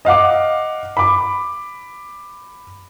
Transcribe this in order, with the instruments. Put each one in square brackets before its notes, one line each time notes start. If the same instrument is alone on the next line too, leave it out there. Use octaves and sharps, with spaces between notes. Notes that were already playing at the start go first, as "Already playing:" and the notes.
[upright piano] D#5 F5 F#5 D6
B5 D6